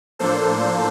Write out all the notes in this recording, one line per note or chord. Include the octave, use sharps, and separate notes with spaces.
A2 F3 A#3 D4 A4 C5